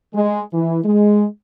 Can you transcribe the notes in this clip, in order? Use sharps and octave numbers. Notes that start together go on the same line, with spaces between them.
G#3
E3
G#3